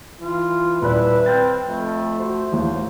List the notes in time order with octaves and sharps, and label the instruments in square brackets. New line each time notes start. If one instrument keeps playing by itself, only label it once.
[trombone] E3 [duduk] F4
[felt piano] D#1 D5 F#6 [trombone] E4 [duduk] B4
[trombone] C4 [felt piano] F6 G6 A6
[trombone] F2 [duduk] A3
[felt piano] F#4 [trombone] C5
[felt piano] A1 D#2